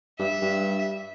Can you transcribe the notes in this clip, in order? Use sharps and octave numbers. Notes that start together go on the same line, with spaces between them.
G2 E5
G2